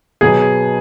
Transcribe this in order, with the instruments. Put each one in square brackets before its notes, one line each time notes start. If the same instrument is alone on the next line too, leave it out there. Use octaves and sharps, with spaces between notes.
[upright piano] B2 F#3 B3 G#4